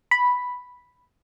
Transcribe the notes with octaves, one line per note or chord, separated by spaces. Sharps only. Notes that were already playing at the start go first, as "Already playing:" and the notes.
B5